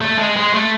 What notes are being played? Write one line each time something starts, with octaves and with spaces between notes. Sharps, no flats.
A3
G#3
G#3
A3